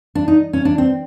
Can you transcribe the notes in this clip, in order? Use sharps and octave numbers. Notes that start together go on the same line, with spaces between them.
D4
D#4
C#4
D4
C4